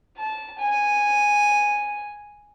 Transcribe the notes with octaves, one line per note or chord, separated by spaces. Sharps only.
A5
G#5